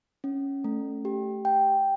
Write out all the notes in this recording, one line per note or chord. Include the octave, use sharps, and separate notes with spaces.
C#4
A3
G4
G5